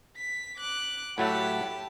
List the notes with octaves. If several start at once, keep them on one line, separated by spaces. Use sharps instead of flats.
B6
D6 F#6
A2 F#3 A3 G4 F#5 A5 B5